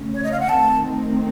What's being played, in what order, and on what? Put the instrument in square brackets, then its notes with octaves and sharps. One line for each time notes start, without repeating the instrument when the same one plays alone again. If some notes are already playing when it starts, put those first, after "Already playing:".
Already playing: [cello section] C#3 A3 C#4
[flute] C#5
D#5
F5
F#5
[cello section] D#3 A3 C4 D#4 [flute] A5